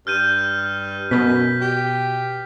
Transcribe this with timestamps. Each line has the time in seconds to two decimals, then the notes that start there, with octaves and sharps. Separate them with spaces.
0.07 G2 F6 G6 D#7
1.11 F#2 B2 B6
1.61 G4